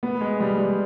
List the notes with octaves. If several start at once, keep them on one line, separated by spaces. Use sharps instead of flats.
B3
G#3
G3
G3